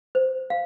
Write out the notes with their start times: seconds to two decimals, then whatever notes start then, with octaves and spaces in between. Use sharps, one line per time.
0.15 C5
0.50 F5